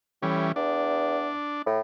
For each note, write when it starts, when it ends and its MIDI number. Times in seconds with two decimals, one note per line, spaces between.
0.22 0.49 45
0.22 0.52 52
0.22 0.52 55
0.22 0.52 61
0.56 1.33 40
0.56 1.62 62
1.66 1.80 45